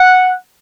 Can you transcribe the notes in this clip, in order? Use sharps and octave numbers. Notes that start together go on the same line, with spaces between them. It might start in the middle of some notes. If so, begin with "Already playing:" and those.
Already playing: F#5